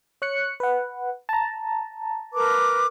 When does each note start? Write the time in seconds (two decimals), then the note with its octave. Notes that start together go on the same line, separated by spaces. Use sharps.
0.22 C#5 F#6 C#7
0.60 B4 F#5
1.29 A5 A#5
2.34 A#4 B4 D6